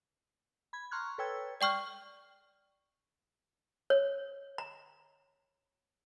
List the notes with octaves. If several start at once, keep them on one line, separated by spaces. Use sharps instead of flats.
B5 G#6
A#5 C6 C#6 F6 F#6 G#6
A4 B4 C#5 G5 E6 G#6
D5 G5 C#6 F6 G6
C#5
A#5